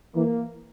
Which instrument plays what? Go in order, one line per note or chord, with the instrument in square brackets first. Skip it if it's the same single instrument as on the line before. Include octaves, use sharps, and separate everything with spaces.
[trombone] E3 [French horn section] A#3